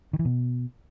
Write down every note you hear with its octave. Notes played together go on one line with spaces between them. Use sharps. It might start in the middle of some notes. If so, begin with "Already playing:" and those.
D#3
E3
B2